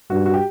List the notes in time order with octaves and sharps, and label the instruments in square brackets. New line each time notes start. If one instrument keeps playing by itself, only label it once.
[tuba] G2 [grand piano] F#4
[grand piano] F#4
G4